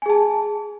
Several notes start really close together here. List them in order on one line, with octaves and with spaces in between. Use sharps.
G#5 G#4 A5